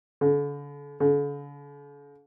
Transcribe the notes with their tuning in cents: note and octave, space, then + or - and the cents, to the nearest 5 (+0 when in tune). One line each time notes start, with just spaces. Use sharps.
D3 -40
D3 -45